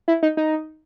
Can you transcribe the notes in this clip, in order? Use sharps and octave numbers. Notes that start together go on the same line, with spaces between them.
E4
D#4
D#4